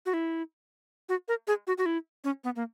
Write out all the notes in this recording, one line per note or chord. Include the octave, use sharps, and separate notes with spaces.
F#4
E4
F#4
A#4
G#4
F#4
F#4
E4
C#4
B3
A#3